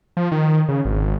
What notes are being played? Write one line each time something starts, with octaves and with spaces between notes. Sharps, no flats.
F3
D#3
C#3
G#1